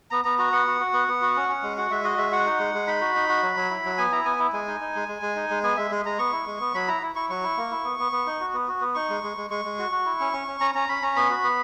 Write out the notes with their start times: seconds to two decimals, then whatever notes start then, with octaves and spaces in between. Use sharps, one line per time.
0.11 B3 A#5
0.24 B3 A#5
0.39 F#4 A#5
0.53 B3 F#5
0.67 F#4
0.80 F#4
0.93 B3
1.08 B3
1.22 F#4
1.36 C#4
1.49 C#4
1.62 G#3
1.77 F#4 F#5
1.91 G#3 E5
2.04 F#4 D#5
2.18 G#3 E5
2.32 F#4 F#5
2.46 D#4
2.59 G#3
2.74 G#3
2.87 D#4 B5
3.01 F#4
3.15 D#4
3.29 F#4
3.42 F#3
3.56 F#3
3.70 E4
3.85 F#3
3.98 B3 G#5
4.11 E4 A#5
4.25 B3 G#5
4.39 E4
4.53 G#3 G#5
4.68 D#4
4.81 D#4
4.95 G#3
5.08 G#3
5.22 G#3
5.36 D#4
5.50 G#3
5.63 B3 G#5
5.77 G#3 E5
5.91 G#3
6.05 G#3 A#5
6.19 B3 C#6
6.32 E4
6.46 G#3
6.60 B3
6.74 F#3 B5
6.88 E4 A#5
7.02 E4
7.16 E4 C#6
7.29 F#3 C#6
7.43 E4
7.57 A#3
7.71 E4
7.84 B3
7.99 B3
8.12 B3
8.26 D#4
8.41 F#4
8.53 B3
8.68 F#4
8.81 B3
8.95 D#4 C#6
9.09 G#3
9.23 G#3
9.37 G#3
9.50 G#3 C#6
9.65 G#3
9.79 F#4
9.92 F#4
10.06 E4
10.20 C#4
10.33 C#4
10.47 C#4
10.61 C#4 A#5
10.75 C#4 A#5
10.89 C#4 B5
11.02 C#4 A#5
11.16 B3 B5
11.30 F#4
11.44 B3